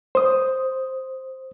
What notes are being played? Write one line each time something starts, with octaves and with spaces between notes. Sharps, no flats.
C5 D#6